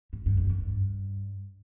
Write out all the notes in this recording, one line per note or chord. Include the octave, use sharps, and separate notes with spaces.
G#2
G2
F#2
G2